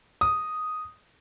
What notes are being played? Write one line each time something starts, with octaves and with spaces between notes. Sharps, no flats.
D#6